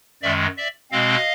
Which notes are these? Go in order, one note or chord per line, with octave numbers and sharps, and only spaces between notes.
F#2 D#3 G#3 D5 E5
D5 E5
B2 G#3 C4 D#5 F5